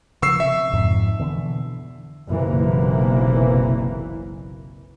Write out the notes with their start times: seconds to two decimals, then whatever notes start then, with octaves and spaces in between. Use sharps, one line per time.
0.22 C#3 F3 C#6 E6 C7
0.40 C3 E5
0.73 F2 G#2 F3
1.19 B2 D3 E3
2.28 F#1 B1 C3 E3 A#3